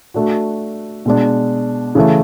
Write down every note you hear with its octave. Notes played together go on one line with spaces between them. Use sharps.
A3 D4 F#4
B2 G#3 D4
C#3 E3 A3